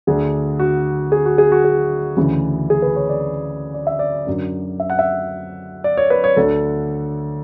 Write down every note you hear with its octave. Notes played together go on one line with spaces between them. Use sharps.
D2 D3 G#4
F#4
G#4
F#4
G#4
F#4
G#4
D2 C#3 E3
G#4
B4
C#5
D5
D5
E5
D5
F#2 D3
E5
F#5
E5
D5
C#5
B4
C#5
D2 D3 A4